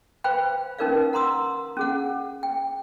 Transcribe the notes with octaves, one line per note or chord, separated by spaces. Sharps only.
B4 C5 F5 G5 B5
C#4 D#4 A#4 B4 D5 F5
F#5 A#5 C6 D#6 E6
C#4 G#4 F#5
G5